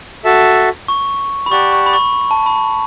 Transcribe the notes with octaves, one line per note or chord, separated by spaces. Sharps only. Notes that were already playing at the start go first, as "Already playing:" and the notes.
F#4 A4 E5 A5
C#6
B5
G4 D5 F#5 A5 C#6
C#6
B5
C#6
A5
B5